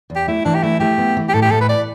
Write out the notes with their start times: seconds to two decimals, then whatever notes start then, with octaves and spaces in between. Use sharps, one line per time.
0.10 E2
0.16 G4
0.28 A3 E4
0.45 E3 D4
0.55 G4
0.63 A3 E4
0.80 A3 G4
0.98 B3
1.17 E3
1.29 G4
1.34 A2 A4
1.42 G4
1.51 A2 A4
1.61 B4
1.69 D5